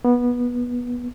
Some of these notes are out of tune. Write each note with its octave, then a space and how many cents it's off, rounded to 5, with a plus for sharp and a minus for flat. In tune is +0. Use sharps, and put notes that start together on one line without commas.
B3 -20